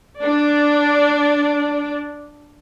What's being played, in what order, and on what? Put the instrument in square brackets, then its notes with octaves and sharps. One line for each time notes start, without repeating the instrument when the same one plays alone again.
[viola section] D4 D5